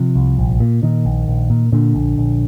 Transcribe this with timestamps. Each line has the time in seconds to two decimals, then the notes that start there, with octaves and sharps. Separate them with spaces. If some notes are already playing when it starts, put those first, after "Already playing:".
Already playing: C3 F3
0.15 C2
0.38 A#1
0.60 A#2
0.83 A#2 D#3
1.05 A#1
1.27 A#1
1.50 A#2
1.72 A#2 D3
1.94 A#1
2.18 A#1